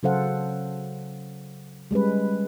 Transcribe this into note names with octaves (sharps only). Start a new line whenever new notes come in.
C#3 F#3 A4 C5 F5 F#5
G3 G#3 C#4 B4